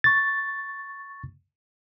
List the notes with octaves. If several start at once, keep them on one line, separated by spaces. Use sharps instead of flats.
C#6 A6